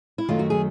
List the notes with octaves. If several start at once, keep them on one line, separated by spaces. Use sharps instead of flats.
E4
F#2 D#3 F#3 A3 F4
F#4
G#4